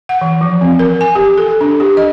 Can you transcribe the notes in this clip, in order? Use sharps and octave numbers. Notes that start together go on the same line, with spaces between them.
F#5
E3
F3
C4
A#4
G#5
G4
A4
D4
G4
D#5